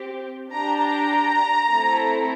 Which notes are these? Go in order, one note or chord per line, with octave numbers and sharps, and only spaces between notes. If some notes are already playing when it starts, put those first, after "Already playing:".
Already playing: C4 G4
D4 G4 A#5
A#5
A3 C4 E4 A4